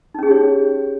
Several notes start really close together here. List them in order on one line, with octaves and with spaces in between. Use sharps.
D#4 C#4 G#4 G4 C#5